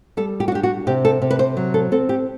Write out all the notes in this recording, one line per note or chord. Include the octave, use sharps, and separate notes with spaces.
G3 A4
G4
F#4
D4 G4
F#4
C3 G4
A4
C3
B4
C5
F#3
A4
C4 A4
G4